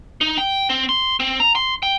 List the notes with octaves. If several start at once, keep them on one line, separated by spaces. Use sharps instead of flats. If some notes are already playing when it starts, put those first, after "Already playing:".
D#4
G5
C4
C6
C4
A#5
C6
G5